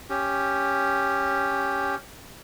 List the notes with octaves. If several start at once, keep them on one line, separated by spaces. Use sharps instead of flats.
C#4 G4